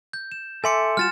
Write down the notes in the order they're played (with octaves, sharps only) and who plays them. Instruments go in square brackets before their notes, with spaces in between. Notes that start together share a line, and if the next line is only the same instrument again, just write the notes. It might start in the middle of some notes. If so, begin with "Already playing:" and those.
[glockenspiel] G6
E7
[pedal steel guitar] A4 E5 D6 [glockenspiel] G#5 C6 C#7
[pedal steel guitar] G3 F4 F#4 [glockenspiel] F6 A6 E7